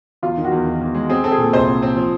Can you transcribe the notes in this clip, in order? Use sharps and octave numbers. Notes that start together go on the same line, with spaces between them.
E2 F4
D#3
F#4
E2
D#3
E2
G#3
C4 G#4
C4 A4
G#4
A#2 A4
C2 C5
C4
C4
F3